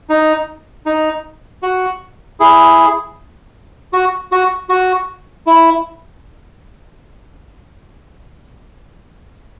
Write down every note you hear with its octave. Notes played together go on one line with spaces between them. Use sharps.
D#4
D#4
F#4
E4 G#4
F#4
F#4
F#4
E4